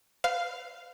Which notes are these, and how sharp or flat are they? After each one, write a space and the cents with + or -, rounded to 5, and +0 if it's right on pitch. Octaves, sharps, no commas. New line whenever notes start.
B4 +40 F5 +0